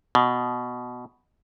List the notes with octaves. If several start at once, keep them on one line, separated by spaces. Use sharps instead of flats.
B2